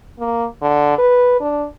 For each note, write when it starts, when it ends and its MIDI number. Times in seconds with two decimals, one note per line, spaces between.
0.19 0.45 58
0.62 0.97 50
0.98 1.39 71
1.40 1.65 62